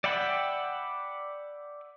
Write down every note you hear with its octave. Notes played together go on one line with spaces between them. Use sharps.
D5 E5 F#5 G5 B5